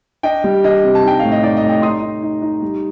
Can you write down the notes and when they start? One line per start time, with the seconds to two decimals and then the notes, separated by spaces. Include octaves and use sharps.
0.23 D4 D#5 G5
0.44 G3
0.64 D4 D#5
0.84 C3
0.95 A5
1.03 D#4 G5
1.19 A2 F5
1.32 D#5
1.43 D#4 D5
1.57 D#5
1.62 A2
1.69 D#5 G5
1.82 D#4 C6 D#6
2.02 D#4
2.23 D#4
2.42 D#4
2.62 G3